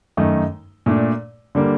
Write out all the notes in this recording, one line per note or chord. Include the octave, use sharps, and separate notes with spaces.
F#2 D#3 A3 D#4
A#2 A3 D4
D3 G3 A#3